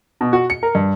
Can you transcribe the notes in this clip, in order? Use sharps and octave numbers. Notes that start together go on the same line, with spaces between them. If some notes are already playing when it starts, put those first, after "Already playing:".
B2
F#4
C#7
A#4
G2